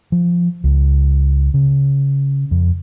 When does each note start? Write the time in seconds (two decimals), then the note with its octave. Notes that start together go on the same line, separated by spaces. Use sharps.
0.12 F3
0.64 C#2
1.54 C#3
2.51 F2